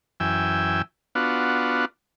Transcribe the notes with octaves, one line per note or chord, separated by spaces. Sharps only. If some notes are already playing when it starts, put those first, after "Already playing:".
F#2 E3 G5 G#5 E6
B3 D4 F4 F#4